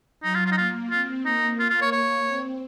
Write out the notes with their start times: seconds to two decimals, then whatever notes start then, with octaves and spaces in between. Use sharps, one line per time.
0.23 F#3 D#4
0.35 F4
0.46 F4
0.52 D#4
0.57 A#3 F4
0.90 C4 F4
1.25 A#3 D#4
1.59 F4
1.70 F4
1.82 C#5
1.92 C#5
2.27 C4